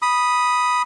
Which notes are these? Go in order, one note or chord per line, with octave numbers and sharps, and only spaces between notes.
B5 D#6